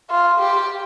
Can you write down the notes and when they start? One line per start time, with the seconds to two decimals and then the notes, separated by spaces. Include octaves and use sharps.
0.10 F4
0.40 G4